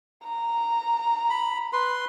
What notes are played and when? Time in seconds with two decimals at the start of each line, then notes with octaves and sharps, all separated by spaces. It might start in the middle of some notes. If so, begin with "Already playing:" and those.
0.24 A#5
1.30 B5
1.73 B4 C6